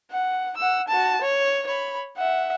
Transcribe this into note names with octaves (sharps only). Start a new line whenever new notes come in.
F#5
F#5 E6
F#4 A5
C#5
C#5 B5
E5 F#5